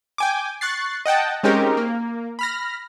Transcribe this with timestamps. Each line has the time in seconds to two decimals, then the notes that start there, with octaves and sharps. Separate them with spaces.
0.18 G5 G#5 D6
0.61 C#6 F#6 A6 C7
1.06 D#5 F#5 G5 A5
1.43 G#3 C4 C#4 D#4 G4 A#4
1.77 A#3
2.39 B5 F6 A#6